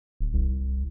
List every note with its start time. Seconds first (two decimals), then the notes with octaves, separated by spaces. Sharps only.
0.20 D1
0.34 C2